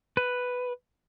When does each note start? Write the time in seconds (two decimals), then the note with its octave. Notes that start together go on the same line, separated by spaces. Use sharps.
0.17 B4